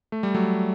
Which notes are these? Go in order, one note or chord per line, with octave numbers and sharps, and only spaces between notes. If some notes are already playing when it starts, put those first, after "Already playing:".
A3
G3
F#3 A3